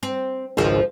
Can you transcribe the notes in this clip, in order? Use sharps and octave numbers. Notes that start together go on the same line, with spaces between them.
C4
G#1 C#2 F3 G#3 C5